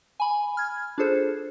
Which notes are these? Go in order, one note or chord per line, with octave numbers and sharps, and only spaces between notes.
G#5 B5
F6 G#6
D4 F4 G#4 A4 C5